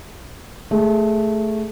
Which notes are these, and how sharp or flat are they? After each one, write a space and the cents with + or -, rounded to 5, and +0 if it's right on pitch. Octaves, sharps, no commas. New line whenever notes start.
A3 +0 G#4 +0